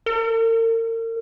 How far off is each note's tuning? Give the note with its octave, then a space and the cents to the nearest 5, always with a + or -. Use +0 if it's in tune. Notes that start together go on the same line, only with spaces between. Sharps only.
A#4 -40